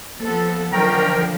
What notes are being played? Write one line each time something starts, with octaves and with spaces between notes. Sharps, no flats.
F3 A#3 B3 A4
D3 D#3 F3 F#3 C#4 A#4 G5 A#5